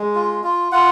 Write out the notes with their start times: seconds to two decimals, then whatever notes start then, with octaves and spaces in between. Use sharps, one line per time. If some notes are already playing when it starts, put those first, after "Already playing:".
Already playing: G#3
0.15 F4
0.44 F4
0.72 F4 F#5